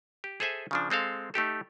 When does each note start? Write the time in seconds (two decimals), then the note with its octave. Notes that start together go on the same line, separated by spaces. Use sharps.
0.24 G4
0.40 G#4 A4 C5 E5 G#5
0.71 C#3 F3 D4
0.90 G#3 C4 A4 F5
1.34 A3 D#4 G4 A4